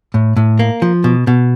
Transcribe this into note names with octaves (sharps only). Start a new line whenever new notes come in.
A2
A2
A#3
F3
B2
B2